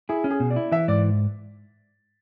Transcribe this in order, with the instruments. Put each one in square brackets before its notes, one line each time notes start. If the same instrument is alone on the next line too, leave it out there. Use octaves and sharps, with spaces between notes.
[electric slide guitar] E4 [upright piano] G#4
[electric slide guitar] C#4
[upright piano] G#4
[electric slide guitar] B2
[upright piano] D5
[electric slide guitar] E4
[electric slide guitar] E3 [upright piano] E5
[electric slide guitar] G#2 [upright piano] D5